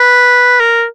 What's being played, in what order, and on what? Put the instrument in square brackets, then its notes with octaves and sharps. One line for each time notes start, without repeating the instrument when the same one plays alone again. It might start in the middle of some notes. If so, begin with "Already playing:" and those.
Already playing: [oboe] B4
A#4